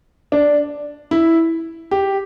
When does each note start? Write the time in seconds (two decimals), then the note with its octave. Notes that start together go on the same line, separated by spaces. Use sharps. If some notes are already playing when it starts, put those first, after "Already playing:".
0.32 D4
1.11 E4
1.91 G4